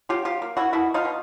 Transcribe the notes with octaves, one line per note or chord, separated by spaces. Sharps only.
F#3 F4 G4
F4 G4
A#3
E4 F#4
B2 E4 F#4
D#4 F4
B2